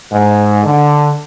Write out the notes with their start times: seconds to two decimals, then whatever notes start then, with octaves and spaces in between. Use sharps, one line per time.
0.12 G#2
0.64 D3